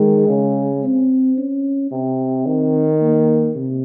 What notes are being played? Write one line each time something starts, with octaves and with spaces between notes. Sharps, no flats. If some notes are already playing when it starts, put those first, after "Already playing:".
Already playing: D#3 G#3
C#3
C4
C#4
C3 C4
D#3
A#3
C3